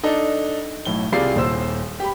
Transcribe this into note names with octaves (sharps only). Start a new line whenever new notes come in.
D4 D#4 A4
B1 A2 G7
C2 C3 F4 G#4 D5 C7
D#1 A#2 C5 E6
G4 B5